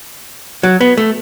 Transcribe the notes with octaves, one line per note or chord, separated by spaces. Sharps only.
F#3
B3
A3